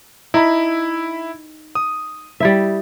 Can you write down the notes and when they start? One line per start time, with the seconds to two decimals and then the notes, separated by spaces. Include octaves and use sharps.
0.34 D#4 E4 B5
1.75 D#6
2.40 G3 E4 E5